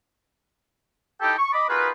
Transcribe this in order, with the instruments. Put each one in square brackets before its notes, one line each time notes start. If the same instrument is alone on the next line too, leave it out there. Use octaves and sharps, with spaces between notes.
[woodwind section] D#4 E4 G4 A4 G5
C#6
D#5 B5 D6
D#4 F4 F#4 G#4 A#4 B4